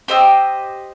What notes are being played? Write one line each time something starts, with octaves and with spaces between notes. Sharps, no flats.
G4 C5 D#5 E6